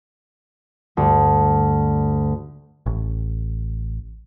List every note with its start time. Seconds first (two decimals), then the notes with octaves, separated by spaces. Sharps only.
0.97 D2 G2
2.86 A1